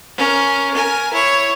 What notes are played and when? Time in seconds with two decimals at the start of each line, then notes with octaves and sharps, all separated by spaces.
0.17 C#4 A#4
0.73 A#4 G#5
1.12 E4 C#5